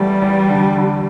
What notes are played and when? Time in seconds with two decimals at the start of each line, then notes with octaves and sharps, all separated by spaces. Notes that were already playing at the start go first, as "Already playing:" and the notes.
Already playing: E2 G3 A3
0.22 E2
0.49 D3
0.76 D3